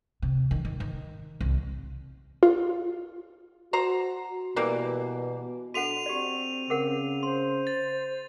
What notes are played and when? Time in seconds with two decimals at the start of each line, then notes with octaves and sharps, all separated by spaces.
0.22 C3
0.51 D#3
0.65 D#3
0.80 D#3
1.40 C2
2.43 F4
3.73 F#4 C5 A#5
4.56 B2 E3 G3 A#3
5.74 D4 F#4 A4 F#5 D#7 F7
6.06 C4 G4 D5
6.70 C#3 G#4 A#4 F#5
7.23 C5 C6
7.67 A6